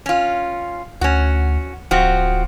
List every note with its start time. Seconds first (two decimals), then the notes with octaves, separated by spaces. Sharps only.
0.06 C#4 F4
1.01 D2 C#4 F#4
1.91 D1 F3 C4 F#4